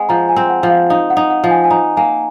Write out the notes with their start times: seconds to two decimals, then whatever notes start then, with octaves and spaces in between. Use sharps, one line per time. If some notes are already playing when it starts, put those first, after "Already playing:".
Already playing: G#3 C4 F#5 G#5
0.09 F3 A#5
0.29 G#5
0.36 C4
0.50 F#5
0.63 F3
0.70 F5
0.90 D#4 F5
1.10 F#5
1.17 D#4
1.30 F#5
1.44 F3
1.51 G#5
1.64 G#5
1.70 D#4 A#5
1.97 A#3 G#5